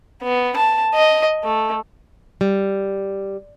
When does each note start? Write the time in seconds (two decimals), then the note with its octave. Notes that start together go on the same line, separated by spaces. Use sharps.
0.23 B3
0.56 A5
0.94 D#5
1.43 A3
2.41 G3